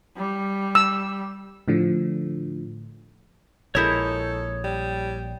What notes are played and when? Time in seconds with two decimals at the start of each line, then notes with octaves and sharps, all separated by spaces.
0.16 G3
0.75 E6
1.68 A2 D3 F3
3.75 A#1 G#3 E4 A4 A#4 C#5 D#6 G6
4.64 G3